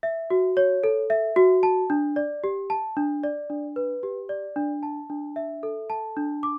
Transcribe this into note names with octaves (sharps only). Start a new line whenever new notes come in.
E5
F#4
C#5
A4
E5
F#4
A5
D4
D5
G4
A5
D4
D5
D4
B4
G4
D5
D4
A5
D4
E5
A4
A5
D4
D6